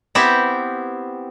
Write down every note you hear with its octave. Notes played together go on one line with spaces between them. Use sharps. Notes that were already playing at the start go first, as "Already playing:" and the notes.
B3 C4 E4 G4